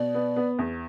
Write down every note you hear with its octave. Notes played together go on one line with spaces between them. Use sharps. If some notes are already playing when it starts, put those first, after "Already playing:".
Already playing: B2 D5
B3
B3
E2